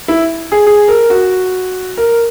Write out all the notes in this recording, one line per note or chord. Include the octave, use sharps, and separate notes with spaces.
E4
G#4
G#4
A#4
F#4
A#4